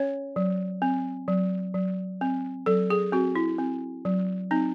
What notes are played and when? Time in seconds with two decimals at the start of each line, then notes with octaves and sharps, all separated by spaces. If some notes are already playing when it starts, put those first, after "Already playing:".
Already playing: C#4 C#5
0.36 F#3
0.82 C4
1.28 F#3
1.74 F#3
2.21 C4
2.66 F#3 A4
2.90 G#4
3.12 C4 F#4
3.36 E4
3.58 C4
4.05 F#3
4.51 C4 D#4